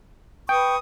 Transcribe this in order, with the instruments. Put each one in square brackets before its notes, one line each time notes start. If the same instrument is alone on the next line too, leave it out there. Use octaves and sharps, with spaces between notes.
[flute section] B4 C#6 D#6 [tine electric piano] G5